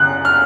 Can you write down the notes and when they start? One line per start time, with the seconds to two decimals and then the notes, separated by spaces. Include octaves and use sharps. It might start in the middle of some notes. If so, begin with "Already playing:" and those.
Already playing: F#2 C#3 F#6
0.25 F6